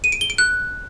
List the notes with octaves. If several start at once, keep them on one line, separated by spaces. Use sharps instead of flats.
D#7
D7
G7
D7
F#6